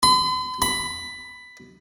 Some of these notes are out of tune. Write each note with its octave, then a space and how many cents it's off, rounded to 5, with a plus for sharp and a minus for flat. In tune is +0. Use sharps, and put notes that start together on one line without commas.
B5 +45
B5 +10